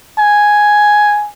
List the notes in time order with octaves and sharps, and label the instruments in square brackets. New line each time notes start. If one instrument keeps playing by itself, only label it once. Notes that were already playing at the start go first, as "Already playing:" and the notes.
[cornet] G#5